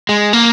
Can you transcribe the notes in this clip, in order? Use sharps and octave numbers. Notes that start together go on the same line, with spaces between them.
G#3
A#3